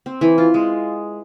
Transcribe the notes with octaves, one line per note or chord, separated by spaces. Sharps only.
C4
E3
F4
G#3